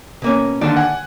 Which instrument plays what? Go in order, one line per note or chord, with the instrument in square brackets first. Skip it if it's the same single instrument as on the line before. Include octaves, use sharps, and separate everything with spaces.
[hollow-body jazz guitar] B2 A#3 C#4
[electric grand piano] D#2 D3 [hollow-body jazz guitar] D5 A5
[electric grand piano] F#5 G#5